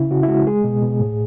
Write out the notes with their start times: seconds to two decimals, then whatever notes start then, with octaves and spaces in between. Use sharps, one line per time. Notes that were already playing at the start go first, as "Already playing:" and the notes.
Already playing: C#3 E4
0.11 C#3 F#4
0.23 E4
0.28 G#3 F#4
0.47 G#3 G#4
0.64 B2
0.82 B2
1.00 A2